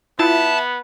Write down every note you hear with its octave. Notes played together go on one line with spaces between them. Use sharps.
B3 E4 F4 E5 A5